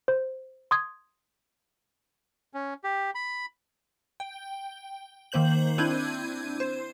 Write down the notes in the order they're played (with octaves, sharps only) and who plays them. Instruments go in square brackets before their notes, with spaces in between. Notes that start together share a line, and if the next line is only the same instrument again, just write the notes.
[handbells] C5
C6 D#6 G#6
[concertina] C#4
G4
B5
[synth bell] G5
D#3 A#3 C5 G6 F#7
C4 D4 E4 G6 G#6 D#7
C5